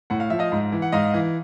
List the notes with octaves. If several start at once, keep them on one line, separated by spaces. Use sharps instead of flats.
A2 F#5
F5
F3 E5
D#5 F5
G#2
E3
F#5
G#2 D#5 F5
E3